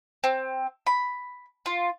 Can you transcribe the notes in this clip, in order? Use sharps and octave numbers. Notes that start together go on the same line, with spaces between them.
C4
B5
F4